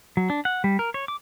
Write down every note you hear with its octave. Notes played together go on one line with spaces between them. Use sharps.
F#3
D4
F#5
G3
A#4
C#5
D6